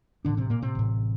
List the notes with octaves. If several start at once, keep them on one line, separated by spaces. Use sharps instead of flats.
A1 A2 D3 D4
C3 C4
A#2 A#3
C3 C4
A1 A2